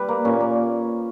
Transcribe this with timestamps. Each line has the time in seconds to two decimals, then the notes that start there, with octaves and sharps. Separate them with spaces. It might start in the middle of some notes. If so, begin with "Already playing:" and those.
Already playing: G3 B4
0.08 A#3
0.25 A#2 C#4
0.40 A#3